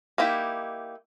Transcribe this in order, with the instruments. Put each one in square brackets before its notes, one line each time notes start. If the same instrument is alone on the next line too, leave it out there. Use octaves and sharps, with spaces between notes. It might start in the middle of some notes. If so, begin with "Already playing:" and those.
[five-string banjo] A#3 D#4 E4 G4